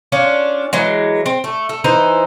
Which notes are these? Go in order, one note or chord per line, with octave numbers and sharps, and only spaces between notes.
C#4 D4 F4
E3 F#3 G#3
C4
A3
A3
E3 D#4 C5